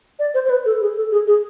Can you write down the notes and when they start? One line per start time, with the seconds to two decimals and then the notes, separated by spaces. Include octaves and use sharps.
0.19 D5
0.34 C5
0.45 C5
0.50 B4
0.66 A4
0.81 G#4
0.96 A4
1.12 G#4
1.27 G#4